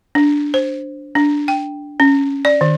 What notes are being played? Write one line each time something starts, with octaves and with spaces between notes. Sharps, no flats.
D4
C5
D4
G5
C#4
D5
D#3